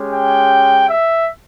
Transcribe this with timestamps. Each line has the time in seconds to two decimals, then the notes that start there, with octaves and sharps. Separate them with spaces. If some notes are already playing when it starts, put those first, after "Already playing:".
Already playing: G#3 C#4 G4
0.14 G5
0.87 E5